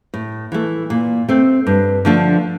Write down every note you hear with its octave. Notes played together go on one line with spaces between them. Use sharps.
A2
E3 A3
A#2
A3 C4
G2
D3 F3 A3 D4